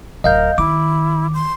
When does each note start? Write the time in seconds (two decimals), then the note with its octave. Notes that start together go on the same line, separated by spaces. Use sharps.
0.24 D1 A#4 D#5 F5 G6
0.58 D#3 E4 D6
1.34 C6